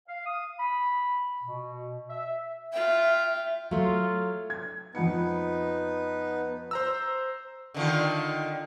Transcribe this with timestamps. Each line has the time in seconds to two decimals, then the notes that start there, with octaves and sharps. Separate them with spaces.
0.08 F5
0.26 D#6
0.60 B5
1.43 B2
2.10 E5
2.73 F4 E5 G5
3.71 F#3 A3 F4
4.50 G#6
4.95 F2 B3 D#4 B4 F#5 C#7
6.71 C5 A#5 E6
7.74 D3 D#3 F4